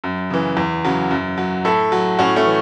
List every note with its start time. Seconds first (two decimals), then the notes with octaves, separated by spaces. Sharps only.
0.04 F#2
0.30 C#3 E3
0.57 E2
0.85 C#3 F#3
1.11 F#2
1.38 F#3
1.65 A2 E4 A4
1.92 F#3
2.19 A2 C#4 F#4
2.36 A3 C#4
2.46 E3